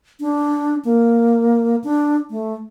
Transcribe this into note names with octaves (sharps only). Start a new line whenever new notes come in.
D4
A#3
D4
A3